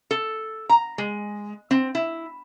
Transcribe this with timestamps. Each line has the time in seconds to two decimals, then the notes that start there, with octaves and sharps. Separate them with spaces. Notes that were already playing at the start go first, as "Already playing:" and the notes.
0.11 A4
0.69 A#5
0.98 G#3
1.71 C4
1.95 E4